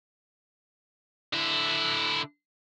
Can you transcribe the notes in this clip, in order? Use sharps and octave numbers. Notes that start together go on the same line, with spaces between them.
D3 E4